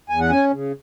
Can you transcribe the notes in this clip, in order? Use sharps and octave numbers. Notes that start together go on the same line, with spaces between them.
E2 G#5
F#5
C#4 G#5
C#3